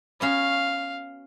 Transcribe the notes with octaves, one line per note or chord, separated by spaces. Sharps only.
B3 C#4 F#4 F5